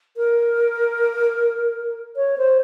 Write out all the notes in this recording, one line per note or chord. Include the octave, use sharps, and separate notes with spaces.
A#4
C#5
C5